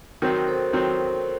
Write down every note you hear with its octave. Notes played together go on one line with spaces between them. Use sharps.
D#3 F#3 C4 F#4 A#4
A4 C5
D#3 F#3 C4